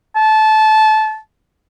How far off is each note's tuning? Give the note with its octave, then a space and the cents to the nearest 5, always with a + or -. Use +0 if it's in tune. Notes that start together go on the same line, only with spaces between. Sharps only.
A5 -20